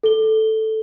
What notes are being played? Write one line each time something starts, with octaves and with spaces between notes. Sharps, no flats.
A4 G7